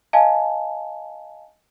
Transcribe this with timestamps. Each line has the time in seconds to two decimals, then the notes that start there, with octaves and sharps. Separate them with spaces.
0.13 D#5 F5 G#5 A5